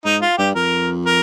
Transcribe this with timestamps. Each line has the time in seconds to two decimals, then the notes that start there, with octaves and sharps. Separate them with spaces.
0.05 G#2 D#4
0.22 F4
0.38 G2 G4
0.55 F2 A#4
1.06 A#4